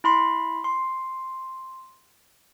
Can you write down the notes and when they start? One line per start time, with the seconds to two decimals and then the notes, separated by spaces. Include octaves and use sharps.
0.04 E4 B5 C6
0.64 C6